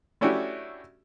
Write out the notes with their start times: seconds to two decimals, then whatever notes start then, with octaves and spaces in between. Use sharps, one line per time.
0.21 A3 C#4 D4 E4 F#4 G4